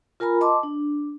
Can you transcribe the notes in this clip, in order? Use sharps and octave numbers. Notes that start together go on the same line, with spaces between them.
F4 A#4 G#5 A#5 B5
D#5 A5 C6 D6
D4